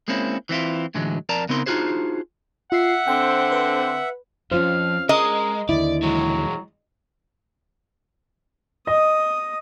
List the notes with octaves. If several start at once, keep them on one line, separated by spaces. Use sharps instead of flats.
G#3 A#3 C4 C#4 E4
E3 C4 E4 F4
A2 D3 E3 F#3 G#3
F2 A#4 D5 A5 A#5
C#3 B3 C4 D#4 A#4 C6
D4 D#4 F4 F#4 G#4 C5
F4 E5 F#5 C7
D3 C4 G5
B4
F2 C#4 F4 C5 F5
G#3 A#4 D#5
D#2 D3 E4 D5
E3 F#3 G#3
D#5 D#6